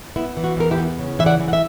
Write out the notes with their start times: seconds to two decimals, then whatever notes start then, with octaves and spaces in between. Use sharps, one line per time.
0.16 B3 E4
0.37 E3
0.44 F#4
0.57 E2 A#4
0.71 E4 G4
0.78 B3
0.99 C#3
1.19 E3 E5
1.26 D5 F#5
1.40 E3
1.48 F#5
1.53 E5